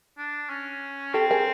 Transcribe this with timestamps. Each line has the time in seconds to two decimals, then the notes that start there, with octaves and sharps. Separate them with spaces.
0.18 D4
0.49 C#4
1.14 C4 G4 A4
1.30 G#4 A#4